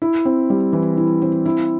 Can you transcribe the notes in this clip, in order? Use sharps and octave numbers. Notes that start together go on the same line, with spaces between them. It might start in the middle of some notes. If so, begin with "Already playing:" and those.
E4
C4
G3
E3
E4
C4
E4